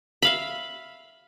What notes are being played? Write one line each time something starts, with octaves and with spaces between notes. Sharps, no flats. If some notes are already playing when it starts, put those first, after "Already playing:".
E5 F5 B5